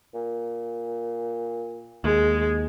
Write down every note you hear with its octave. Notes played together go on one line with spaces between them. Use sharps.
A#2
D#2 G#3